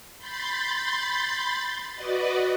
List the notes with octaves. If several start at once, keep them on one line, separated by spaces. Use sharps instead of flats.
B5 C6 G6 A6
F#4 B4 D5 D#5